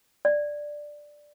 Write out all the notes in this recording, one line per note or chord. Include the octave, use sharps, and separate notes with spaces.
D5